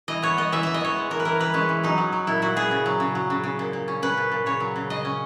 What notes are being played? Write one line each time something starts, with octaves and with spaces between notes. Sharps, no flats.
E3 D#5
B3 C#5
B3 D#5
E3 E5
E3 E5
D#5
B3 C#5
G#3
E3 A#4
B4
E3 A#4
E3 B4
G#3 C#4
E3
F#3 D#4
F#3
F#3
A#2 E4
A#2 F#4
B3 G#4
C#3
F#3
C#3
F#3
C#3
C#3
A#2
A#2
C#4
C#4 B4
A#2
A#2
C#3 C#5
F#3
C#3
C#3 D#5
C#4